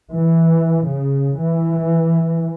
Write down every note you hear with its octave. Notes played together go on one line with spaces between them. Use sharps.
E3
C#3
E3